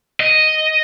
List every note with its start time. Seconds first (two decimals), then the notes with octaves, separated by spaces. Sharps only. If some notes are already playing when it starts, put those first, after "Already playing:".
0.20 D#5